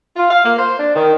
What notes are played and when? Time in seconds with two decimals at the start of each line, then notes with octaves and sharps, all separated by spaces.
0.17 F4
0.31 F5
0.45 A#3
0.59 C5
0.79 D4
0.95 D#3